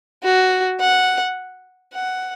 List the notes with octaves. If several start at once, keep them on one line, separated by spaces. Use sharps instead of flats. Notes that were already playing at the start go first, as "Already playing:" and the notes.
F#4
F#5
F#5